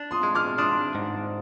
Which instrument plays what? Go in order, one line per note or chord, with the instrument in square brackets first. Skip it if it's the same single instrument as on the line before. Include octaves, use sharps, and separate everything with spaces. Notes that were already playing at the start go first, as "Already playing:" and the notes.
Already playing: [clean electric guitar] D4
[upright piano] C6 D#6
[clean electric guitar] G#3
[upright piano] D6 F6
[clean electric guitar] D4 [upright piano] C6 D#6
[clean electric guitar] G#2